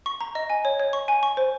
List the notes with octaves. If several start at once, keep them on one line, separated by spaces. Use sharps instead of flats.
C#6
A#5
D#5
G#5
C#5
C#5
C#6
G#5
C#6
C5